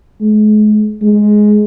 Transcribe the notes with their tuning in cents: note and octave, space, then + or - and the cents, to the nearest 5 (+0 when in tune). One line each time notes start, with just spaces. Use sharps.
G#3 +40
G#3 +10